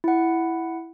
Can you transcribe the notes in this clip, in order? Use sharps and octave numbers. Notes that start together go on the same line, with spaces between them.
E4 F#5